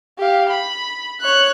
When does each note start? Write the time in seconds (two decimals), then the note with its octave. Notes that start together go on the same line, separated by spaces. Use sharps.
0.18 G4 F5
0.50 B5
1.21 C#5 F#6